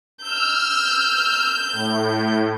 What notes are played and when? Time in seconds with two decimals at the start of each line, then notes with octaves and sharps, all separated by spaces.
0.22 E6 F6 G6
1.72 A2